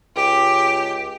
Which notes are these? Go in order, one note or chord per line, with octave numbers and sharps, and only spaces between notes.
C#2 G4